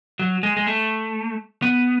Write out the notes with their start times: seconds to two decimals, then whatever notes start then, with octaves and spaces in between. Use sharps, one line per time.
0.19 F#3
0.43 G#3
0.57 G#3
0.67 A3
1.62 B3